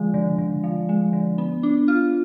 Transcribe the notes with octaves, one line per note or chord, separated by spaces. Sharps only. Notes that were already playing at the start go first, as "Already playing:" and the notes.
Already playing: D3 F3 G#3
D3
D3
F3
G#3
D3
B3
D4
F4